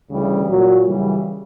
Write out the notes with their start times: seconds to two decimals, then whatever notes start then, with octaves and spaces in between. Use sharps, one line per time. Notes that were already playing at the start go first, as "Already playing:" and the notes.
0.10 D2 C#3 E3 G3
0.48 A#2 F#3
0.86 F#2 C#3 E3 G3